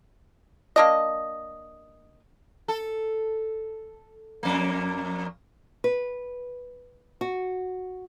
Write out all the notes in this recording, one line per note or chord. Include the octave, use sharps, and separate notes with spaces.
A#3 D4 D#5
A4
F2 A#3
B4
F#4